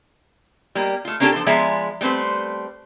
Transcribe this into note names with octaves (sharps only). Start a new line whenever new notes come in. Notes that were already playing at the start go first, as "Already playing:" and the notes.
G3 A#3
A3 F4
A#3 C#4 D4 F#4 G4 A4
F3 A4
F3 G#3 B3 D5 E5 A#5
G3 A3 C4 B4 C5